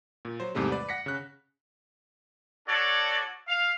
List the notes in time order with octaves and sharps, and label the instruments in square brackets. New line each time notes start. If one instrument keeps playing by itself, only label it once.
[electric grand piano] A#2
F#3 C5
E2 G#2 C3 G3 A3
B4 D5
F#5 A#6 B6 C#7
C#3 F#6
[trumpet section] D4 F#4 A4 C#5 D5
F5